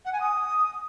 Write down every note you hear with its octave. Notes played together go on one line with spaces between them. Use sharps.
F#5
G#5
D#6